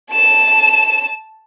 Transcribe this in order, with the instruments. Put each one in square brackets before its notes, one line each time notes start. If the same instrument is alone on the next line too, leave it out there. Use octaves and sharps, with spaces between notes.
[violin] A5 E7